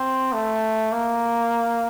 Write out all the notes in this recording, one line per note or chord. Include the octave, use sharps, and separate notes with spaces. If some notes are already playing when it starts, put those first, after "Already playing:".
Already playing: C4
A3
A#3